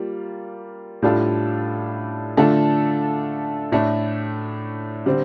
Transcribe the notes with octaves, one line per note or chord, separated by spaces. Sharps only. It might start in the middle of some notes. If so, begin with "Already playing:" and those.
Already playing: G3 A#3 F4
A2 G3 D4 F4 A4
D3 A3 D4 F4 A4
A2 A3 D4
D3 G3 C4